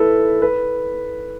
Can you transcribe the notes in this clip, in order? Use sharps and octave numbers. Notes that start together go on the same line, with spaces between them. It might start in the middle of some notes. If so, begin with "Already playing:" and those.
Already playing: E4 A4 B4
B4